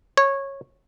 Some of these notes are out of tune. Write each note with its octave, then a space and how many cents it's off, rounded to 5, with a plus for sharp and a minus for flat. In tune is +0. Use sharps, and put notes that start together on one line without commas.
C#5 -15